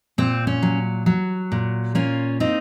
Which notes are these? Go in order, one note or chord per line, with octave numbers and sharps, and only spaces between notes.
A#2 C4
C#4
F#3
F#3
A#2
A#3 C#4 F4
C4 D#4